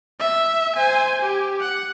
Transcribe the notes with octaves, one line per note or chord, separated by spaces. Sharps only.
E5
C5 G#5
G4
F#5